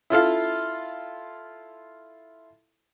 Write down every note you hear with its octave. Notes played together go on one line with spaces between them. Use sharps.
E4 F4 A4 F5